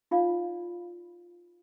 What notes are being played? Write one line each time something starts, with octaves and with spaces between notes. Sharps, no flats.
D#4 F4 D5 F5